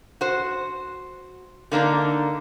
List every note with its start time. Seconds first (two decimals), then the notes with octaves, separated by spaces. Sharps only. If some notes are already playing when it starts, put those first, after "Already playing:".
0.21 F#4 C5
1.72 D3 A#3 D4 D#4